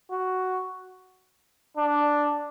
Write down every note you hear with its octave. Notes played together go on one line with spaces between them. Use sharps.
F#4
D4